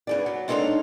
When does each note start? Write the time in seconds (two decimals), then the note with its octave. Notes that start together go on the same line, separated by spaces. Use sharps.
0.07 G2 G#4 D5
0.26 F#3
0.48 G#3 D4 D#4 A4 C#5 F5